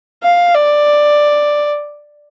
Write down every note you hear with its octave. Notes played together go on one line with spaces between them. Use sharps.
F5
D5